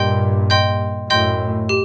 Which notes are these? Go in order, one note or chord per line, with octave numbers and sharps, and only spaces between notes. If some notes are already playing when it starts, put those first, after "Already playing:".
Already playing: G2 A#2 D#5 G5 C6 G6
D#5 G5 C6 G6
F#2 A2 D#5 G5 C6 G6
G4